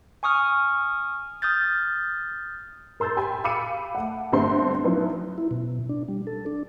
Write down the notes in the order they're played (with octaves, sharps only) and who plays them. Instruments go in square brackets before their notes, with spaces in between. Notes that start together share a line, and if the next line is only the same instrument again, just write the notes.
[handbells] G#5 C#6 D#6 F6
D#6 F6 G6 A6
[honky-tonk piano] A#4 C6 E6 G6 A6
G4 G5 G#5 B5
F5 B5 D6 E6 C#7 D#7
A3 F#5
G1 G2 A3 C4 C6
F3 F#3 B3 C#4 D#4 E4
[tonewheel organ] E4
B2
D4
G3
A4
D4